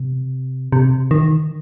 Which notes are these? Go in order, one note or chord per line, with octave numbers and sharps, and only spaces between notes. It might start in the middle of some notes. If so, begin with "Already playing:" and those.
Already playing: C3
C3
D#3